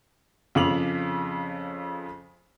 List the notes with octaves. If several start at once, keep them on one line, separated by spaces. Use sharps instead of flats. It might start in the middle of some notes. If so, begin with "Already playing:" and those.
F2 C#3 D6 F7 F#7